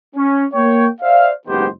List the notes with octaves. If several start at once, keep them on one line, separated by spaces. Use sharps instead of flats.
C#4
A#3 C#5 G5
C5 D5 E5 F5
F#1 G#2 D#3 B3 G4 C5